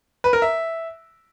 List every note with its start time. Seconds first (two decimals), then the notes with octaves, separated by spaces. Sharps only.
0.24 B4
0.33 A#4
0.42 E5